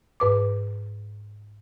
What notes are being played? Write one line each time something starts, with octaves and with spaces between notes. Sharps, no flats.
G#2 B4 D6